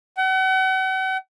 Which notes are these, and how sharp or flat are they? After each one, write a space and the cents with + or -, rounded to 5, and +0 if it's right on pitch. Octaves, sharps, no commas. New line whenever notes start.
F#5 +40